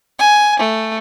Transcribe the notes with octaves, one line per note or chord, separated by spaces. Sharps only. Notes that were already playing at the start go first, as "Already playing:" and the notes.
G#5
A3